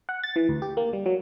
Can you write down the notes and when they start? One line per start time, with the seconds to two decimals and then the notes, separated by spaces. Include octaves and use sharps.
0.09 F#5
0.24 A6
0.36 E3
0.49 D2
0.62 G4
0.77 A#3
0.93 G3
1.06 F#3